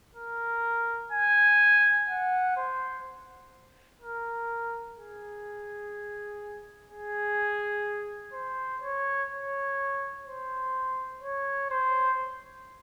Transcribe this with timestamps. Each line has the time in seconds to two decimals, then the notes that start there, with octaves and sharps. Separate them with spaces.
0.15 A#4
1.11 G#5
2.09 F#5
2.57 C5
4.01 A#4
4.97 G#4
6.89 G#4
8.33 C5
8.82 C#5
9.31 C#5
10.26 C5
11.23 C#5
11.70 C5